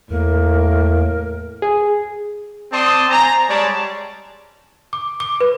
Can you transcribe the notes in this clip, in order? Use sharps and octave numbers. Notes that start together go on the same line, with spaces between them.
E2 A2 A#3 A#4
G#4
C4 D5 A5 C6 D#6
C5 G#5 A#5
G3 G#3 C#5 D5 A5
D6
D6
B4